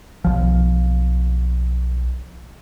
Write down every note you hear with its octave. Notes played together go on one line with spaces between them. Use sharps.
B1 F3